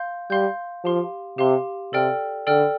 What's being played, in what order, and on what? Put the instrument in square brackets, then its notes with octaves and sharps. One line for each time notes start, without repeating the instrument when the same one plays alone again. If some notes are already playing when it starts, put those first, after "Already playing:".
Already playing: [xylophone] F5 C6 G6
[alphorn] G3 [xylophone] F5 C6 G6
[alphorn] F3 [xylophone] G4 F5 C6
[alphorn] C3 [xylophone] G4 F5 C6
[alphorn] C3 [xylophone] A4 D5 G5 F6
[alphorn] D3 [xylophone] A4 D5 G5 F6